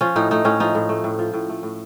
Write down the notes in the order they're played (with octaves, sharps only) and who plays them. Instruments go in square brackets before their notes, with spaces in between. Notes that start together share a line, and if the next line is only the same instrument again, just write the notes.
[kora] F3 C#4
A2 D#4
A3 D#4
A2 C#4
F3 D#4
A2
A3
A2
F3
A2
A3
A2